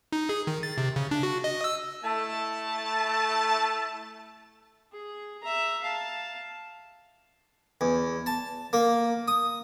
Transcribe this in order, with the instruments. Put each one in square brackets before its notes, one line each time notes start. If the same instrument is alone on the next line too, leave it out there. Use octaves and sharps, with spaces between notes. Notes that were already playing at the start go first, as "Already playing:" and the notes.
[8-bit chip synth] D#4
G#4
D#3
A6
C3
C#3
D4
F#4
D#5
E6
[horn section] A3 E4 A5
[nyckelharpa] G#4
E5 A#5
F5 A5
[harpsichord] E2
A5
A#3
D#6